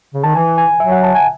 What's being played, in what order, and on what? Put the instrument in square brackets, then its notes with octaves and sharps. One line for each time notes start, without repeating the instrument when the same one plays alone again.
[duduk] C#3
[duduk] D#3 [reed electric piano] A5
[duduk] E3 [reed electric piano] G#5
[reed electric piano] G#5
[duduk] F#3 [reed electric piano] E5
[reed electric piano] F#5
A5
G#5